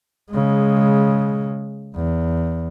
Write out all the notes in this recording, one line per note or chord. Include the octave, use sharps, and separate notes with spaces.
C#3 G#3
E2